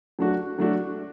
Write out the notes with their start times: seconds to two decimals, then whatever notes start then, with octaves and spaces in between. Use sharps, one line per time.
0.19 F#3 A3 D4 F#4
0.58 F#3 A3 D4 F#4